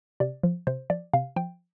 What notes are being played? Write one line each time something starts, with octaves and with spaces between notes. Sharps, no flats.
C3 D5
F3
C3 C5
F3 D5
C3 F5
F3 G5